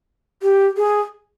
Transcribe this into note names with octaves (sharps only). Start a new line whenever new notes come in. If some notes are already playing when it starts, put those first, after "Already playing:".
G4
G#4